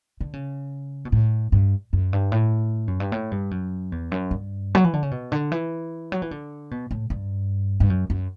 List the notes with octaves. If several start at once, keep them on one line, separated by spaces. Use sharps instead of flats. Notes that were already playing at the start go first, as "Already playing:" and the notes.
D3
C#3
B2
A2
G2
F#2
G2
A2
F#2
G2
A2
G2
F#2
E2
F#2
G2
F#3
E3
D3
C#3
B2
D3
E3
F#3
E3
D3
B2
A2
G2
G2
F#2
F#2